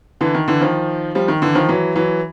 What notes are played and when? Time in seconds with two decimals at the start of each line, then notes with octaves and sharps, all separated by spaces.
0.21 D3 E3
0.35 D#3
0.48 D3 E3
0.61 D#3 F3
1.15 F3 G3
1.28 D#3
1.42 D3 E3
1.55 D#3 F3
1.69 E3 F#3
1.96 E3 F#3